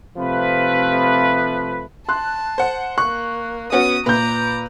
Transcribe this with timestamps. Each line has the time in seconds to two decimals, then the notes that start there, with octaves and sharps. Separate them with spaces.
0.18 C3 F3 A3 B4
2.09 A5 C6 F#6
2.58 C5 F#5
2.98 A#3 C#6 F#6
3.72 B3 C#4 F#4 D#6
4.06 A#2 B4 A#5 D6 G6